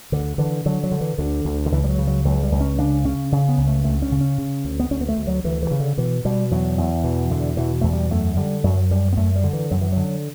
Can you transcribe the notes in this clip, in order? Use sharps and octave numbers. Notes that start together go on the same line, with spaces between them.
D2 D3
D3 E3
D3 F#3
F#3
D3
E3
D2 D3
D2
D3
C#2 E3
G3
F#3
C#3
F#3
C#2 F#3
G3
C#2
C#4
C#3 D4
C#3 C#4
C#3
B3
C#2
A3
D2 A3
C#4
C#3
C#4
C#3
D2
B3
D2 C#4
B3
A3
D2
F#3
D2 E3
E3
C#3
D3
B2 E3
B2 G3
E2 F#3
E2
B2 E3
E2 D3
B2 E3
E2 A3
G3
F#2 A3
D3 G3
F#2 F#3
F#2 G3
B3
F#2 A3
G3
D3
E3
F#2 F#3
E3
D3 F#3